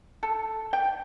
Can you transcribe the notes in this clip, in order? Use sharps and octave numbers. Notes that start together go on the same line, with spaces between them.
A4
G5